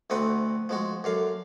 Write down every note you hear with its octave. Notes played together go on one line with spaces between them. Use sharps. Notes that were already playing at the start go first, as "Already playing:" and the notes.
D2 A3 C4 D#5 F#5 B5
F3 G#3 F#4
F#2 D3 F5